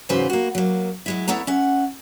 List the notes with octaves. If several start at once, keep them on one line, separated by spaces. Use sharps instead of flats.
E2 G#2 C#3 F#3 B4 C5
A#3 F#4
F#3 A#3
F#3 G#3 E4
B3 E4 A4 C#5 F#5 A#5
C#4 E5 F#5